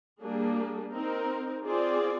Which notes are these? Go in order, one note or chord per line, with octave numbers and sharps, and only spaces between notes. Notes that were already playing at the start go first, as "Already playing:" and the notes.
G3 A#3 D4 G#4
C4 D#4 A#4
C4 F4 G#4 D5